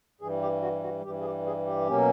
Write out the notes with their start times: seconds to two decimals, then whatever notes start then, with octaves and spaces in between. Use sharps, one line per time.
0.21 G2 E3 G3 G#4
0.42 G4
0.62 F#4
0.83 F#4
1.05 G2 E3 G3 G4
1.21 G#4
1.25 G4
1.46 G#4
1.67 G4
1.87 B2 F#3 A#3 C#4